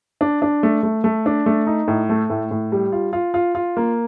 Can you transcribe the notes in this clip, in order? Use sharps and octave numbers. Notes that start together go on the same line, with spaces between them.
D4
D4
A3
A3
A3
D4
A3
D#4
A2
A3
A2
A2
G3
F4
F4
F4
F4
A#3